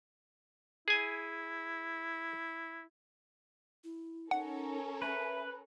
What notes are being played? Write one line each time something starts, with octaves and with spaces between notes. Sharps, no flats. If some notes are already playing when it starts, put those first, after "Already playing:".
E4 G#4 G#5
E4
C#4 D#4 A4 A#4 F#5
B4 E5